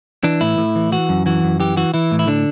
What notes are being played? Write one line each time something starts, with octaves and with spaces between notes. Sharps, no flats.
E3 D4
A2 E4
A2
E3
E3 F#4
F#2
E3 F#4
F#2
E3 G4
E3 F#4
E3 E4
A2
E4
D3 D4